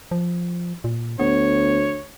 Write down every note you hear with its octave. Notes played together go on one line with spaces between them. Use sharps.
F3
A#2
D2 B3 C#5